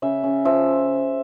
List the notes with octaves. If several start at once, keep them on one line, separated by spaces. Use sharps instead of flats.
C#3 E5
C#3
F3 E5